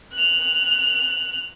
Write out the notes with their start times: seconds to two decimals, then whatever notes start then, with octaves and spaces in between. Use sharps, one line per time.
0.14 F#6 F7